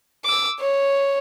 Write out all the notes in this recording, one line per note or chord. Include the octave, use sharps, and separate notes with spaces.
D6 E6
C#5